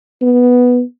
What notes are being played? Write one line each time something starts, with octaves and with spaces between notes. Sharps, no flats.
B3